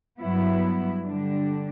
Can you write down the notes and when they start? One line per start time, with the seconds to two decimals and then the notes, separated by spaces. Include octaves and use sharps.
0.20 G2 F#3 B3 E4
1.03 D3 G3 D4